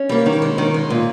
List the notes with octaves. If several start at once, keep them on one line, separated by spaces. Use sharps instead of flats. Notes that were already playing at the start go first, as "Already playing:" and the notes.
Already playing: C#4
G3 A#3
D#3
G#3
D#3
G#3
A#2